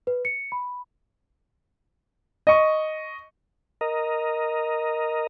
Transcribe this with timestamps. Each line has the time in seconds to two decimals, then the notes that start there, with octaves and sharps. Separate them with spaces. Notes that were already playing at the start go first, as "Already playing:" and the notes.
0.07 B4
0.25 C#7
0.52 B5
2.47 D#5 C#6
3.81 A#4 D#5